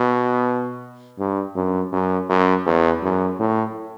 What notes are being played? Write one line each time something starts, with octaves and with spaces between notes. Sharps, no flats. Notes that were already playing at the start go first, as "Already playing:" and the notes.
Already playing: B2
G2
F#2
F#2
F#2
E2
F#2
A2